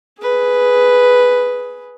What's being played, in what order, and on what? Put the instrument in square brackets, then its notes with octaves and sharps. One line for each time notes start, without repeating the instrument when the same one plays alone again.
[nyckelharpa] G#4 B4